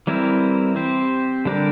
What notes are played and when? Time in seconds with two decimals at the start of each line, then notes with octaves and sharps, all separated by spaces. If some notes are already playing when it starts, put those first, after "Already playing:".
0.07 E3 G3 C4 E4 A#4
0.76 C4 G4 C5
1.45 D3 G3 D4 G4 A#4